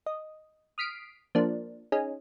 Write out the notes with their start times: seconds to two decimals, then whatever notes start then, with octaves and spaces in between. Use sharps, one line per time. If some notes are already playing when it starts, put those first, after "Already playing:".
0.06 D#5
0.78 D#6 F6 B6 C7 D7
1.35 F3 A#3 D4
1.92 C#4 D#4 G#4